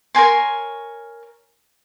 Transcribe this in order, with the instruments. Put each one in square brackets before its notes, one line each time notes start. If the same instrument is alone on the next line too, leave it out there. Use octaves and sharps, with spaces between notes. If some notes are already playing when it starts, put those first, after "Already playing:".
[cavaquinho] A#4 C#5 G#5 C6